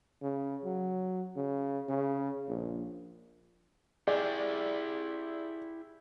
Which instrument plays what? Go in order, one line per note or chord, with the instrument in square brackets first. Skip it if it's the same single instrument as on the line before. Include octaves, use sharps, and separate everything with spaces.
[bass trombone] C#3
F#3
C#3
C#3
A#1
[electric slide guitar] E4 G4 [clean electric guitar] G#4 [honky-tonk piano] D5